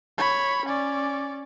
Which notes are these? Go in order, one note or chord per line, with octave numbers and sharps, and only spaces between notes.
C#5 B5
C#4 D5